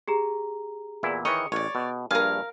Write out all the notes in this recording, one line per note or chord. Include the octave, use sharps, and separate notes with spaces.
G4 G#4 A#5
E2 A#2 E4
D#3 E3 C#5 D#5 C#6
A1 C#5 D5
B2
A#1 G2 A#4 F5 G#5